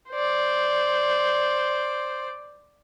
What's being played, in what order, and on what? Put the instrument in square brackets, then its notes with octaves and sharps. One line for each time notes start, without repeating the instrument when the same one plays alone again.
[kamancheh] C5 D5